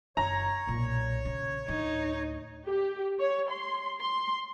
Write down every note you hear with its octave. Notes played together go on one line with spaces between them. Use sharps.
F#1 C#5 A#5
B1 A#2
C#3
D2 A2 D#4
G4
C#5
C6
C6